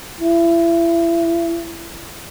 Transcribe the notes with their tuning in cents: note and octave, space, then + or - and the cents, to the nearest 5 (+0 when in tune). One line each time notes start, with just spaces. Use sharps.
E4 +30